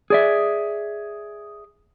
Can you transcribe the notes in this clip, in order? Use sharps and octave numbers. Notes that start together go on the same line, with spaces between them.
G#4 D5 E5